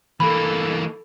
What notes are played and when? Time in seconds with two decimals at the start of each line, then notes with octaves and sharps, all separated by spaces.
0.20 E3 A#3 A4 B5